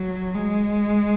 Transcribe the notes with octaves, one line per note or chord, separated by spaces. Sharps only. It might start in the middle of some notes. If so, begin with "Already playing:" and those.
Already playing: F#3
G#3